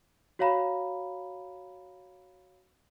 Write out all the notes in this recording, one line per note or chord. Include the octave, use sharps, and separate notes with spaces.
F#4 C#5 F5 A#5 B5